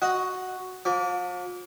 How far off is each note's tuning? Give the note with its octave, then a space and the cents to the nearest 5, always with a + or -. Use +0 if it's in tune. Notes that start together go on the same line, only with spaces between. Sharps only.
F#4 +0 D#5 +10 F#5 +0
F3 +40 D6 -25